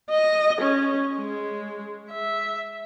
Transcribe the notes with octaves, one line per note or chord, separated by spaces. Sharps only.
D#5
C#4
G#3
E5